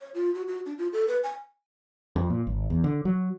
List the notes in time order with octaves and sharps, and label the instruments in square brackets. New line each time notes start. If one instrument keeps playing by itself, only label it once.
[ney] C#5
F4
F#4
F#4
D4
F4
A4
B4
G#5
[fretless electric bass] F2
A#2
G#1
E2
D3
F#3